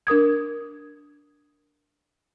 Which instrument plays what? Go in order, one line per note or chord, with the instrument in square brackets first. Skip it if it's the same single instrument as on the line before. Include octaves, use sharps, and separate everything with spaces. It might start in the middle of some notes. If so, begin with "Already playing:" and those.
[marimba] D4 A#4 D#6 G#6